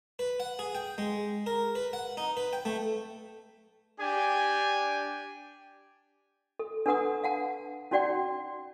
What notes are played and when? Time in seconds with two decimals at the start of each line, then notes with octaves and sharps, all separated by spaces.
0.19 B4
0.40 F#5
0.59 G#4
0.75 G5
0.98 G#3
1.46 A#4
1.75 B4
1.93 F#5
2.17 D#4
2.37 B4
2.53 G5
2.65 A3
4.00 D4 G4 G#5
6.59 A4
6.86 D4 A4 B4 F#5 A#5 D#6
7.24 F5 F#5 A5
7.91 C#4 D#4 F#4 D5 F#5 G5